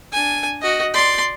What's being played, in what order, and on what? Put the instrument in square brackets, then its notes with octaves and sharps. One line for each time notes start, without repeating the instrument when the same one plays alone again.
[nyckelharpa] D4 G#5
F#4 D#5
D5 C6